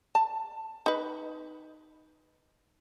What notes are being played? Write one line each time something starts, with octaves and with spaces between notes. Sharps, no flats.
A5
D#4 B4